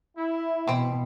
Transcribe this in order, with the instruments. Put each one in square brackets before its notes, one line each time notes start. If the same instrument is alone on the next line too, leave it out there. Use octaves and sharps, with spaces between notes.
[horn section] E4
[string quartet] B2 [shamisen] E3 C4